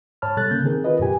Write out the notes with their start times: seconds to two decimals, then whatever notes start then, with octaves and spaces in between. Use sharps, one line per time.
0.22 G#2 C#5 A5 B5 F6
0.37 B2 G3 A4 F#6 A6
0.51 C#3 A#3 G6
0.64 D#3 C4 G#4 A#4
0.84 F4 B4 D#5
0.99 F#2 B2 G4 G#5